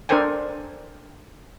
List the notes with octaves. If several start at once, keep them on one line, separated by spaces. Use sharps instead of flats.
D4 A4 A#4 C5 G5 G#5